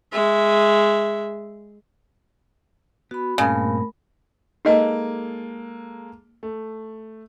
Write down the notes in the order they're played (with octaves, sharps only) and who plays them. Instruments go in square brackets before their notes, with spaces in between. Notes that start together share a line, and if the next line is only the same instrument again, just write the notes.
[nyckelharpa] G#3 E5
[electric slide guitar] B3 [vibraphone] F#4 B5
[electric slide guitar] G2 A#2 C4 [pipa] C#3 [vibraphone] A3 A#4 B5
[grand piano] G#3 A#3 A4 [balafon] D#4 D#5
[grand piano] A3